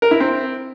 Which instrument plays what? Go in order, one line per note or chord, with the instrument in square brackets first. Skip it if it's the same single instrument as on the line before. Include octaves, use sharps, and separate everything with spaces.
[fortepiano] A#4
E4
C4